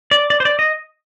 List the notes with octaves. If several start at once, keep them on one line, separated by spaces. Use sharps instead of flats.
D5
D5
C5
D5
D#5